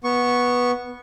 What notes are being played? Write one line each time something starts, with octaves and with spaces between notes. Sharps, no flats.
B3 C#6